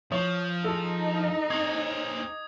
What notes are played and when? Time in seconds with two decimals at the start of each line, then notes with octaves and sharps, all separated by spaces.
0.12 F3 C#5 C#6 D#6
0.64 D#4 G#4 A4
1.50 C4 C#5 D6 D#6 G#6